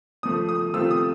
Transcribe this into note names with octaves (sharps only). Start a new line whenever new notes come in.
C#3 F3 A3 D#6
D#6
C3 F3 A3 C4 F4 E6
D#6